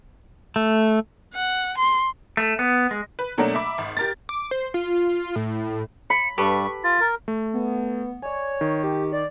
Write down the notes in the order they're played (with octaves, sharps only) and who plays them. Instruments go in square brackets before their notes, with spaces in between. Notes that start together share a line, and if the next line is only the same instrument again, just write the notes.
[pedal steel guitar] A3
[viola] F#5
C6
[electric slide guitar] A3
B3
G#3
[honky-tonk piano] B4
B2 F#3 A3 A#3 D4
E5 B5 D6
G#1
G4 A#4 A6
[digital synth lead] D6
C5
F4
A2
[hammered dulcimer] B5 [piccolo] C#7
[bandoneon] G2 G3 [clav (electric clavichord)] G4 A4 B4 [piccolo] C#6
[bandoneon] F4 [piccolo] A6
[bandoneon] A#4
[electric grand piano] A3
[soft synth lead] B3
[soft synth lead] C#5 [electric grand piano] D5 G#5
[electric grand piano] D#3
[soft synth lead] G4
D5